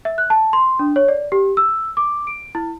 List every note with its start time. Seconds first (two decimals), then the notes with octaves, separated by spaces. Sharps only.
0.05 E5
0.18 F#6
0.30 A5
0.53 C6
0.79 D4
0.96 C#5
1.08 D5
1.32 G4
1.57 E6
1.97 D6
2.27 D7
2.55 E4